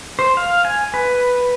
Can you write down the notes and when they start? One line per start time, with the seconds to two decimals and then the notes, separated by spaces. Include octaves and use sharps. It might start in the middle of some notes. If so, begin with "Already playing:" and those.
0.19 C5
0.37 F5
0.65 G#5
0.94 B4